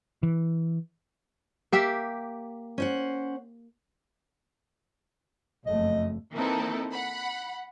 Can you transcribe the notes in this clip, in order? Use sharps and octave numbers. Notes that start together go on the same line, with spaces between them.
E3
A#3 G4 E5
C#4 C5 F#5
F#1 F2 A3 D#5
E3 A#3 C4 D#4 E4 A4
F#5 B5